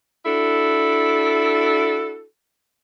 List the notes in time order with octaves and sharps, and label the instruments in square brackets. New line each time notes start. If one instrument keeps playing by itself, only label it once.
[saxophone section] D4 E4 F#4 A4